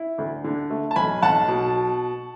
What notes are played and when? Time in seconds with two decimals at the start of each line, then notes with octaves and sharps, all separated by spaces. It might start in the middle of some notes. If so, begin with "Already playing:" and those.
Already playing: E4
0.18 D2
0.44 D3
0.70 A3
0.91 A5
0.96 B1 G#5 B5
1.22 B1 F#5 A5
1.48 B2